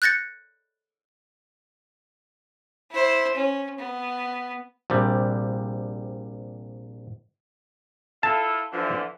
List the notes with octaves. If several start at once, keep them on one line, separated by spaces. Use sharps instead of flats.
F#6 G6 A6 A#6 C#7
E4 C5
C#4
B3
A#1 C3 G3
E4 F4 A4 A5
D3 E3 F3